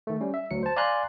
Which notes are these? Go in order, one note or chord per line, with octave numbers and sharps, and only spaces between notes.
D#3 A3
G3 C#4
E5
D2 F#3 C#7
C5 A5
D5 F5 G#5 A#5 C6 F#6